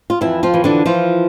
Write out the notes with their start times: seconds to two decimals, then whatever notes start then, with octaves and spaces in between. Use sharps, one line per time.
0.10 F4
0.21 F2 E3 E4
0.43 F3 F4
0.54 E3
0.64 D3 D4
0.86 E3 F3 F4